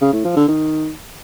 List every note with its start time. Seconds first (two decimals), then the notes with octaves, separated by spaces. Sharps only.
0.01 C#3
0.13 A2
0.25 F3
0.37 D3
0.48 D#3